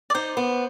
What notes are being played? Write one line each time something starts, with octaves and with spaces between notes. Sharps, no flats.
D5
D#4 C5
B3